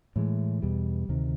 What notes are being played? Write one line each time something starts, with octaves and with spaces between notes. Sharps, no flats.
A2 E3 G#3
E2 B2 G3
D2 C3 D#3